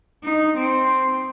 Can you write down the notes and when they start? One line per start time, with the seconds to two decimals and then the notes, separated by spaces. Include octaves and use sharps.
0.23 D#4
0.57 C4